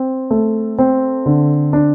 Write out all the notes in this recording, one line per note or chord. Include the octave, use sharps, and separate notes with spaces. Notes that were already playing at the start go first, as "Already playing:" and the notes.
Already playing: C4
A3
C4
D3
D4